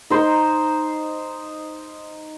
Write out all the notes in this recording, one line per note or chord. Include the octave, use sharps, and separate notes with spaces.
D#4 C5